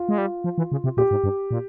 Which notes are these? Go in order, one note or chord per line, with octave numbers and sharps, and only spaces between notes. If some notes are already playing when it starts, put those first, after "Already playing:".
Already playing: F4
G#3
G3
F3
E3
C#3
C3
A#2 G4
G#2
G2
A#2